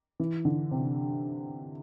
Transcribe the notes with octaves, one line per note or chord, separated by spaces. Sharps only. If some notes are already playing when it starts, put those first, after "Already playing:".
E3
D3
C3